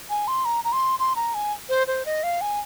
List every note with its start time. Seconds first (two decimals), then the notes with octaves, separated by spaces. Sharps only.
0.10 G#5
0.28 C6
0.45 A#5
0.64 A#5
0.72 C6
0.99 C6
1.16 A#5
1.34 G#5
1.69 C5
1.87 C5
2.06 D#5
2.23 F5
2.41 G#5